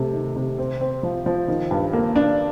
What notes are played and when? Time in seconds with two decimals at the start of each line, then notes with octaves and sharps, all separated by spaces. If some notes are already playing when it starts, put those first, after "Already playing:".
Already playing: C3 A3
0.13 D#3
0.36 C3
0.58 C4
0.81 C4
1.03 F3
1.26 F3
1.48 D#3
1.71 G2
1.93 A#3
2.16 D4